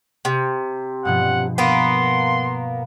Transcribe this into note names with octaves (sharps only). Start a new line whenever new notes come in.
C3
G2 B2 F3 F#5
A#3 B3 C6